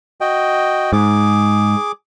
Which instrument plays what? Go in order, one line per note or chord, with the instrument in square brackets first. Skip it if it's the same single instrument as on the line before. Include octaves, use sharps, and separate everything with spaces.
[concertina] F#4 D#5 G5
[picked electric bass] G#2 [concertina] G#4 D6